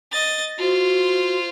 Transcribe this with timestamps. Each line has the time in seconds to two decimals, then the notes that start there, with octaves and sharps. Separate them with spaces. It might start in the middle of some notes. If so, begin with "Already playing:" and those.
0.12 D#5 A6
0.59 F4 F#4 C5